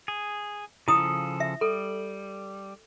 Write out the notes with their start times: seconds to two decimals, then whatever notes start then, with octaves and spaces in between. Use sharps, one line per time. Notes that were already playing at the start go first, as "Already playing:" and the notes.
0.08 G#4
0.88 C#3 F3 E4 A4 D#6
1.40 E5
1.61 G3 A4